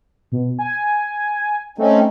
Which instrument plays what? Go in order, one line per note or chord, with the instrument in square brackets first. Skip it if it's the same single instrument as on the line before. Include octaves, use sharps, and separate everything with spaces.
[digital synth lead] B2
G#5
[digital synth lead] A3 [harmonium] C4 C#4 D#4